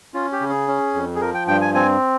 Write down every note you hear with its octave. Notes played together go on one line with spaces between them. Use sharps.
C#4 F4
G4
C#3
G#4
C#4
F2
G#4
F3 A#4
G5
G2 G5
G#5
C4 G#5